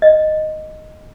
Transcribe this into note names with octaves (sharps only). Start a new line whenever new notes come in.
D#5